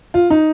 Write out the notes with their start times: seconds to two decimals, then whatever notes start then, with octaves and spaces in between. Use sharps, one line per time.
0.14 F4
0.30 D#4